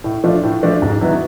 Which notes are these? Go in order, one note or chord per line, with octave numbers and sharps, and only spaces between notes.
A2
F3 A3 D4 F4
A2
F3 A3 D4 F4
G#2
D#3 F#3 B3 E4